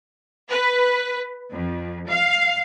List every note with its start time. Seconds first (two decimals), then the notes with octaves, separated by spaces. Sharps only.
0.51 B4
1.52 F2
2.08 F5